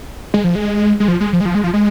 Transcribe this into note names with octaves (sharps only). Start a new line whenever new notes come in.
G#3
F3
G#3
G#3
F3
G#3
F3
G#3
F3
G#3
F3
G#3